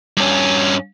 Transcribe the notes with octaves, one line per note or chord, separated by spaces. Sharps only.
G2 C#4